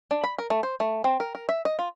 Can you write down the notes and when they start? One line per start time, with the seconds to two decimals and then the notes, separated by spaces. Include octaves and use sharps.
0.11 D4
0.24 B5
0.38 A#4
0.50 A3
0.63 C5
0.80 A3
1.04 C4
1.20 A#4
1.35 A#4
1.49 E5
1.65 D#5
1.79 F4